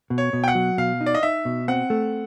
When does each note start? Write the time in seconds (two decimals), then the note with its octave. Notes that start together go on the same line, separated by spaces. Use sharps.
0.10 B2
0.18 C#5
0.33 B2
0.44 G5
0.48 F#5
0.55 F#3
0.78 B2 F5
1.01 D#4
1.06 D5
1.15 D#5
1.23 D#4 E5
1.45 B2
1.68 C4 F#5
1.90 A3